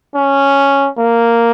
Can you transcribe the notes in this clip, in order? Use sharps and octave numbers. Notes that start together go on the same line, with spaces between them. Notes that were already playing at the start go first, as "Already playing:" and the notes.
C#4
A#3